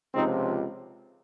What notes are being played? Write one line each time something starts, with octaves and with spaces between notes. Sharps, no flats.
C#2 C3 F3 C4 D#4